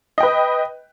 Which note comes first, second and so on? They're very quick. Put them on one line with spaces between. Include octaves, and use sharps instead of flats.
D#5 G5 B4